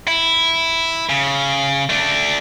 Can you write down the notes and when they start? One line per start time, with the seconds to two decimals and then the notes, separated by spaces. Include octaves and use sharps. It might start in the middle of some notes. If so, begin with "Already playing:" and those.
0.08 E4
1.09 C#3
1.90 A3 D4